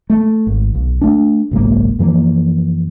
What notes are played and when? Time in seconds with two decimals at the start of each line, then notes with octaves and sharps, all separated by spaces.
0.10 A3
0.47 G#1
0.75 B1
1.01 A3 D4
1.51 F#1 B1 G#2 A#3
1.99 F#2 E3 F3 A#3